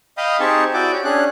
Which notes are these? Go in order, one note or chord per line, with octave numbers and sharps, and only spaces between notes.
D#5 F5 G5 B5 D#6
C4 D#4 G4 G#4 A5 C#6
E4 F#4 D5 G5 D6
G4 C#5
C#4 D4 G#4 F#6